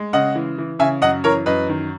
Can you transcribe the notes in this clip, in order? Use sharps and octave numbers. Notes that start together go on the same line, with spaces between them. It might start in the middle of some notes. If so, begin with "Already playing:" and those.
Already playing: G#3
C#3 D#5 F#5
E3
E3
C#3 E5 G#5
F#2 D#5 F#5
E3 A#4 C#5
F#2 B4 D#5
D#3